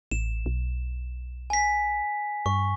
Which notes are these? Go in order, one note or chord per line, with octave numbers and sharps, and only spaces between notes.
A1 E7
B1
G#5 B6
G2 C#6